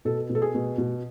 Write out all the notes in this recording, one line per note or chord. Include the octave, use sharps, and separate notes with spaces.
B2 A4
B2
A4
G#4
B2
B2